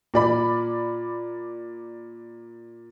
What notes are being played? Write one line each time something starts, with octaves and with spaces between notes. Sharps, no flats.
A#2 D5 B5